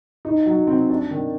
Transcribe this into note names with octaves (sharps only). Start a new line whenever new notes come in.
D#4
F#3
C4
D4
D#3